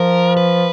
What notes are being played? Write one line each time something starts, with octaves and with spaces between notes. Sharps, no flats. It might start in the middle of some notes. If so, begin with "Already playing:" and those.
Already playing: F3 A#4
B4